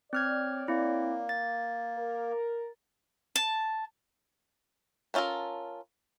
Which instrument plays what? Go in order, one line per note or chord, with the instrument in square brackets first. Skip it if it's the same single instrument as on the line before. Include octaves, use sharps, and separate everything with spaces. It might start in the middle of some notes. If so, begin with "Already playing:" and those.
[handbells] C4 F6 G#6 [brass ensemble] C#5 D5
[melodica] A#3 [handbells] C4 E4
[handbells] A6
[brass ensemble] A#4
[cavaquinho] A5
[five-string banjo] B3 C#4 F4 A4 A#4